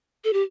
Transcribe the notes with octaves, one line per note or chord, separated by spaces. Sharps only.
A4
G4